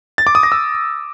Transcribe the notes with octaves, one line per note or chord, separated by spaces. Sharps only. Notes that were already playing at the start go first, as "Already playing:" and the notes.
A6
D6
D#6
A#6
E6